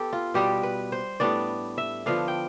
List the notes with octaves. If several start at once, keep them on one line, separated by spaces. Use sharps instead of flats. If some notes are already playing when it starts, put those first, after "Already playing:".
Already playing: B3 G4 A4
F4
B2 G3 B3 G4
B4
C5
A2 G3 B3 D4 D5
E5
D3 F3 B3 D4 F5
G5